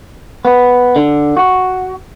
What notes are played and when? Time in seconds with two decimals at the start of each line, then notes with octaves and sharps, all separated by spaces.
0.45 B3
0.96 D3
1.37 F#4